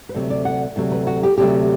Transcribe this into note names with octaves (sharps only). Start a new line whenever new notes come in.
B4
D2 C3 F#3 A3 C5
D5
F#5
D2 C3 F#3 A3
B4
F#4
G4
D2 C3 F#3 A3 G4